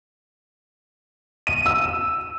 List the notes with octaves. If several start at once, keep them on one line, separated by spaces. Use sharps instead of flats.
D#7
E6